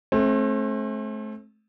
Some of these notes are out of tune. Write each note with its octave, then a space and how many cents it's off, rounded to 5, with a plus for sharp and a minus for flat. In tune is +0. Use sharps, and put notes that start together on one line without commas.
A3 -30 C4 +35